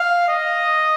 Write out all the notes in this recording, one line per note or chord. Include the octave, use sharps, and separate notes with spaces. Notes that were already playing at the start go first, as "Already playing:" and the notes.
Already playing: F5
D#5